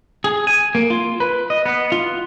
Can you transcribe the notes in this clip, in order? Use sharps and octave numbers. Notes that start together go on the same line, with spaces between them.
G#4
G#5
A#3
F4
B4
D#5
B3
F4